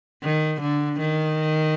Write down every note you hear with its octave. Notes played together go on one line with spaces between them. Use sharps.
D#3
D3
D#3